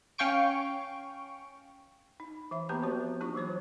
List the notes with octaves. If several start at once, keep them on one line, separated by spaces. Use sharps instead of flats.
C#4 F5 G5 C#6 D7
D#4
E3 E5 B5
A#3 B3 G4 B4 A5 A#5
F3 B3 C4 F#4 G4 D5
A#3 D4 D#4 F4 G4 C#6
E3 F#3 C5 C#5